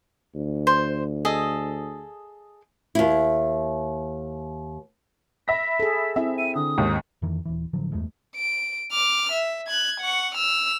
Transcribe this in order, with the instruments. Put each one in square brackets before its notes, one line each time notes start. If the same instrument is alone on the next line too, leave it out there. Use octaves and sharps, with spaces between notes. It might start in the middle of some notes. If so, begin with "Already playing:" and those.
[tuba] D2
[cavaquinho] C5
G#4 A4 D#5
[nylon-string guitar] D#2 E4
[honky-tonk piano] E5 B5 A#6 [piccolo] B6
[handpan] G#4 A4
[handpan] C4 E4 [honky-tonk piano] E5
[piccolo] D#7
[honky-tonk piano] D3 [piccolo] D#6
[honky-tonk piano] D#2 G#2 D#3
[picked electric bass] F2 D#3 E3
D#1 E3
A1 D3 F3 F#3
E2 G2 G#3 A3
[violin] D7
D6 F6
E5
F#6 G#6
F#5 C#6
E6 F6